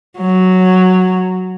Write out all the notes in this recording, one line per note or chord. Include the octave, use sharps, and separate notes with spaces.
F#3